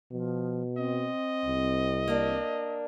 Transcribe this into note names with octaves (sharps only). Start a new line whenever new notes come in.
B2 F3
C4 D#5
C2
A#3 D4